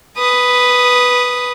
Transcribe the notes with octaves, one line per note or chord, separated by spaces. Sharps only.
B4 D#6